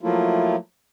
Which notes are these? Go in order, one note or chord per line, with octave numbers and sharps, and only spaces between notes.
F3 F#3 A3 A#3 E4 F4